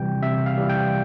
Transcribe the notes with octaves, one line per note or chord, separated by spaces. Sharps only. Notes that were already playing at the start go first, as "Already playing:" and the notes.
Already playing: C3 E3 G3 G5
C3 E5
F5
E3 G3
G5